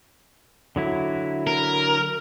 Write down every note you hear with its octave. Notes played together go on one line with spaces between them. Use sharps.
D3 F#3 E4
A#4